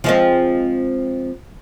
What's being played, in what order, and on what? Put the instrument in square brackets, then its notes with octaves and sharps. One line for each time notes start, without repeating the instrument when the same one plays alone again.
[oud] F3 G#3 C4